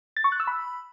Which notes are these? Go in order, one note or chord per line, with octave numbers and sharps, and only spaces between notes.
A6
C#6
F#6
E6
B5